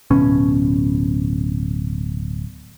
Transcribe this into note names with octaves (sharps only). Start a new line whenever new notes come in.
D1 B2 C#4